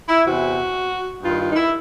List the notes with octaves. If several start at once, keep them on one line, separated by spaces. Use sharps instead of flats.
E4
E2 C3 E3 F#4
G2 D#3 F4
F4
D#4
E4